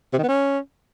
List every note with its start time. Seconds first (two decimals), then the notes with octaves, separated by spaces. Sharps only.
0.13 C3
0.18 D#3
0.23 B3
0.28 C#4